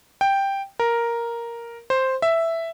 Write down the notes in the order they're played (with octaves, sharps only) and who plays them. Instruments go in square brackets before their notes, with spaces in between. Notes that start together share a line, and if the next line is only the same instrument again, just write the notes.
[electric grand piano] G5
A#4
C5
E5